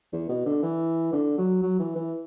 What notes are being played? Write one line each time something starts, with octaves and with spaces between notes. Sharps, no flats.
E2
B2
D3
E3
D3
F#3
F#3
E3
E3